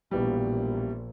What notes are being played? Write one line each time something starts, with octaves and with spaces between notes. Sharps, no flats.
A#1 B2 E3 G3